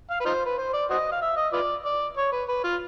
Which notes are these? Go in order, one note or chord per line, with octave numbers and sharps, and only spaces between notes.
F5
B4
D#4 F4 C5
B4
C5
D5
F#4 C5 D#5
F5
E5
D#5
F4 B4 D5
D5
C#5
B4
B4
F4